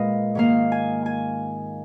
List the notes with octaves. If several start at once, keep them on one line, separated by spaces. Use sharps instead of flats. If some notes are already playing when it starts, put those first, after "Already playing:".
Already playing: A#2 G#3 B4 D#5 F5
G#2 D#3 A#3 F5
G#5
G#5